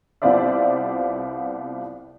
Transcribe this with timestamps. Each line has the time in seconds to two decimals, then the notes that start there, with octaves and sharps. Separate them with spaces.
0.22 C2 B3 F4 C5 D5 E5